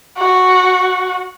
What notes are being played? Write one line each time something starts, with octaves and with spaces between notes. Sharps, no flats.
F#4